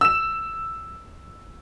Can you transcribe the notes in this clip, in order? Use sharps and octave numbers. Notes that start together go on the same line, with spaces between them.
E6 E7